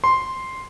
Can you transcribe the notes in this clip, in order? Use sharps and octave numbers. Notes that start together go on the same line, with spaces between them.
C6